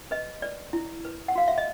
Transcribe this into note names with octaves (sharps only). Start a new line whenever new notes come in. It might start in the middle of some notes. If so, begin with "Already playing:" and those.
B4 D#5
B4 D5
E4
B4
F#5
F#4 F5
E5
D#5